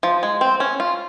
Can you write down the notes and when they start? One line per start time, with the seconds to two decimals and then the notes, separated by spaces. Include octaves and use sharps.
0.03 F3
0.23 G#3
0.41 C4
0.60 C#4
0.80 F4